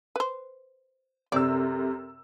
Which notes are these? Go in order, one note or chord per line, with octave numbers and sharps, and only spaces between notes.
B4 C5
F#2 C3 C4 G4 A4 C5 D5 E6